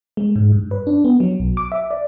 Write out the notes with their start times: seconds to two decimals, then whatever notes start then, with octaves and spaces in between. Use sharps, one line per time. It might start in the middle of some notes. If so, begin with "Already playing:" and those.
0.17 G#3
0.36 G#2
0.52 G2
0.71 B4
0.87 D4
1.04 B3
1.20 F#3
1.39 B1
1.57 D6
1.72 E5
1.91 D5